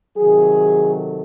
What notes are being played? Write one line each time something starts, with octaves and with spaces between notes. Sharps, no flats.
C3 D#3 F#3 G#4
A4